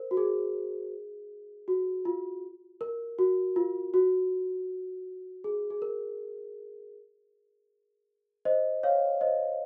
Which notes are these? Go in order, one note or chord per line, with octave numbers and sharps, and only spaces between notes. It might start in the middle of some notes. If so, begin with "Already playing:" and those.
Already playing: A#4 C5
F#4
G#4
F#4
F4
A#4
F#4
F4
F#4
G#4
G#4
A#4
C5 D#5
C#5 F5
C5 D#5